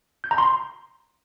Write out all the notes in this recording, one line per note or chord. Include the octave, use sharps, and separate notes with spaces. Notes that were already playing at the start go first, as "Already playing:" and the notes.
G6
A#5
C6